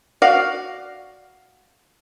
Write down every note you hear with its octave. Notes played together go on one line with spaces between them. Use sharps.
F#4 D5 F5